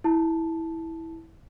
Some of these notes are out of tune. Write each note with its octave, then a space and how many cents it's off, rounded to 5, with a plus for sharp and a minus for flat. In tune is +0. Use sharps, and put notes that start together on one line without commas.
E4 -15 A5 -5